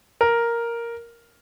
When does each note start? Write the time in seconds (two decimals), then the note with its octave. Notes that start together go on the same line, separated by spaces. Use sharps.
0.21 A#4